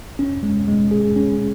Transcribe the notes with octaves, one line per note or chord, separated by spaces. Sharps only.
C#4
G#3
G#3
G#4
C#4